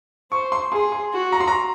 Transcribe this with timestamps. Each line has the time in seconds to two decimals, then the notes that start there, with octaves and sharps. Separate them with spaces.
0.32 C5 C#6
0.52 C6
0.72 G#4 C6
0.92 C6
1.13 F#4
1.32 A#5
1.40 C6
1.48 A#5